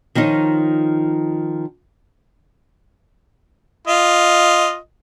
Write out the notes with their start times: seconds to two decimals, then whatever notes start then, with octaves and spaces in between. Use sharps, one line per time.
0.15 D#3 F3 C#4 D#4
3.87 F4 D#5